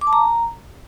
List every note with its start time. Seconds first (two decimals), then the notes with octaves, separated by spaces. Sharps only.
0.01 D6
0.07 A5
0.13 A#5